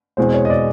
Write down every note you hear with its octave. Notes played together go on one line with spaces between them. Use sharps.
E2 B2 G#3 C4 C5
C#5
D#5
D5